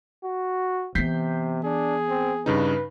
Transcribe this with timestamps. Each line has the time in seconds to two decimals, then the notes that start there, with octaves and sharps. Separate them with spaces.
0.24 F#4
0.95 C3 E3 B3 G6 B6 C7
1.65 D4 G#4
2.09 C4
2.46 G2 C#3 D#4 B4